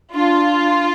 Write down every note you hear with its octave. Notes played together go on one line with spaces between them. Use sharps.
D4 F4